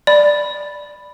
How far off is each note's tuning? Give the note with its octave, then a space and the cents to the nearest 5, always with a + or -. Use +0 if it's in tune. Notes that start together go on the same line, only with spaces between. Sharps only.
D5 +0 B5 +0